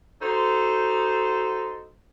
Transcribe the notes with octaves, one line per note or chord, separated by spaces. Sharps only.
D#4 F#4 A4 C5